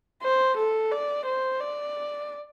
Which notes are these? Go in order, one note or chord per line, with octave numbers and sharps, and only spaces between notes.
C5
A4
D5
C5
D5